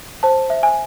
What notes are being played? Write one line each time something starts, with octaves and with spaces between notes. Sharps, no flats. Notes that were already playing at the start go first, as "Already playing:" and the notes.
C5 A5
E5
G#5